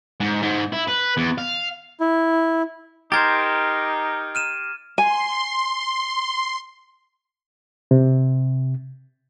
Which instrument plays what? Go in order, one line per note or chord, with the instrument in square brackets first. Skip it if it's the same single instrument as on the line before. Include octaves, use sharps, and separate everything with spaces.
[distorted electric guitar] G#2
G#2
E4
B4
E2
F5
[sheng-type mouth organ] E4
[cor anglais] D#4 [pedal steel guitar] G4 A#4 C5 [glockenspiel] G#6 A6
[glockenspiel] F6 D#7 E7
[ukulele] G#5 [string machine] C6
[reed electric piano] C3